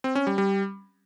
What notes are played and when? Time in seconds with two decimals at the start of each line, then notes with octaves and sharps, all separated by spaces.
0.04 C4
0.15 C#4
0.27 G3
0.38 G3